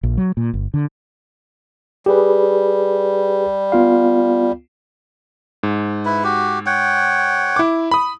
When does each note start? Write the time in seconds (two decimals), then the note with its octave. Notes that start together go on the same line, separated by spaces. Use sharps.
0.03 A#1
0.17 F#3
0.37 A#2
0.53 G1
0.74 D3
2.06 G3 G4 G#4 B4
3.72 B3 F4 F5
5.63 G#2
6.05 E4 B4
6.24 F#4 G4
6.66 C#5 F#5 G5
7.56 E4 D6
7.91 B5 D#6